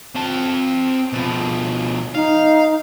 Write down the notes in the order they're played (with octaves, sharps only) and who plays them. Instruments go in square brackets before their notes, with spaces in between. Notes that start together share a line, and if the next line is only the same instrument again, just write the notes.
[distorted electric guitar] C4 A5
B2 F3
[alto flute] D#4 [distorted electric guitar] F5